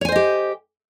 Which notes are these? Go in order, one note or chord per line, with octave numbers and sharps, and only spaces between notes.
G4 C5 C#5 D#5 G#5